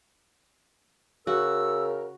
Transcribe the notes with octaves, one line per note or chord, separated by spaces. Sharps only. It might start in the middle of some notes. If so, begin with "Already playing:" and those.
C#3 F#4 A#4 E6